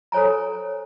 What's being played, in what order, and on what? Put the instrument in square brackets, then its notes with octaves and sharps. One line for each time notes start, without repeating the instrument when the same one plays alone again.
[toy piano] A4 C5 C#5 G#5 A#5